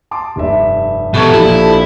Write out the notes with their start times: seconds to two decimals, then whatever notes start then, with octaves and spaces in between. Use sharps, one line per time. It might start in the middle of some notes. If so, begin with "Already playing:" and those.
0.11 A5 C6 D6
0.36 F1 G2 E5
1.14 B2 E3 G4 A4 A5 A#5 C#6 G#6
1.33 A#1 F3 E4